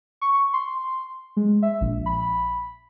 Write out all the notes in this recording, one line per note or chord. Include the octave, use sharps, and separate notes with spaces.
C#6
C6
G#3
E5
A#1
B5